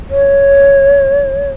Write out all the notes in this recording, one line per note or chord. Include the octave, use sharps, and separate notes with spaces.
C#5